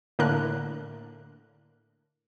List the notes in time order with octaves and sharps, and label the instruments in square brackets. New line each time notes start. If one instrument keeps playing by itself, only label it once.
[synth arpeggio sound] A2 D3 A#3 D4 A#4 F#6